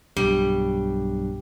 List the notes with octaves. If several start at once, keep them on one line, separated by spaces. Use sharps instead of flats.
B1 G2 G3